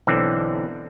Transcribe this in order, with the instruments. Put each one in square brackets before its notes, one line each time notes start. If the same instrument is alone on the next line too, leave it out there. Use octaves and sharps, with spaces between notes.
[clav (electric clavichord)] B1 D3 E3 C4